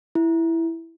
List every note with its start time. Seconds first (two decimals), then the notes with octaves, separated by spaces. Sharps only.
0.15 E4